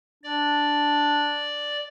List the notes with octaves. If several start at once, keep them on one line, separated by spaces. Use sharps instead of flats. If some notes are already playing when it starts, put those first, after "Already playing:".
D4 D5